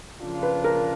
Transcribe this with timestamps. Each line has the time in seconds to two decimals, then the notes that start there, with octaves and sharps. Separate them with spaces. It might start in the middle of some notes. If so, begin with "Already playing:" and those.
0.22 C#3 F3 A#3 D4 F4
0.43 B4
0.64 A#4